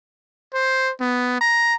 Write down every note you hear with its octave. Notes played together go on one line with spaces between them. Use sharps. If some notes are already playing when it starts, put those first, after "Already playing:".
C5
B3
A#5